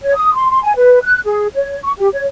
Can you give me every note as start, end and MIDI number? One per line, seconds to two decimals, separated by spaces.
0.03 0.15 73
0.15 0.33 87
0.35 0.51 84
0.51 0.61 84
0.64 0.73 80
0.77 0.99 71
1.03 1.20 90
1.25 1.47 68
1.54 1.79 73
1.83 1.92 85
1.98 2.08 67
2.13 2.25 73